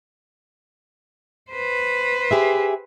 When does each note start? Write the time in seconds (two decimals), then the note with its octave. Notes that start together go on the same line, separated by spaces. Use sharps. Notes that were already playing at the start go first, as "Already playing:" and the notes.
1.51 B4 C5
2.31 G4 G#4 E5